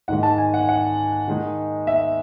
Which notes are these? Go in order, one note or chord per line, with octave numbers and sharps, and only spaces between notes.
G#2 D#3 G#3 F#5
A5
G#5
F#5
F#5
D#3 G#3 D#4
E5